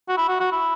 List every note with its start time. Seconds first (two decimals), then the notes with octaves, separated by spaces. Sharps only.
0.09 F#4
0.18 E4
0.29 F#4
0.40 F#4
0.52 E4